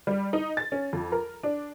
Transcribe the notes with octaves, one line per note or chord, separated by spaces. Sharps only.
G3
D#4
A6
C#4
F2
A#4
D4